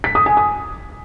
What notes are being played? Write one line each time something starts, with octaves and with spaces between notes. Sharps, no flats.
B6
D#6
G#5
D#6